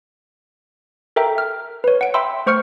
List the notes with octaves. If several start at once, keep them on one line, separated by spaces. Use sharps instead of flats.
A4 A#4 E5 G5 A#5
F6
B4 C#5
F#5 D7
E5 G5 B5 C6 E6
A3 C5 C#6 F6 C#7